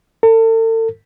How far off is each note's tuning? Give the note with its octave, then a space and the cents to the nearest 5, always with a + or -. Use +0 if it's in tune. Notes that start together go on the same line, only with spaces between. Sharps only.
A4 +40